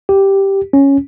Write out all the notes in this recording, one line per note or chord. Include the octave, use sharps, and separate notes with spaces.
G4
C#4